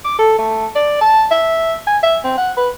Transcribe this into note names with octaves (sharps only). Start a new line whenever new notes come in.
D6
A4
A3
D5
A5
E5
G#5
E5
C4
F#5
B4